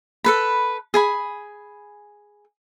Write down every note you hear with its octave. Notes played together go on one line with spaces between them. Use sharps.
A4 B4 B5
G#4 G#5 B5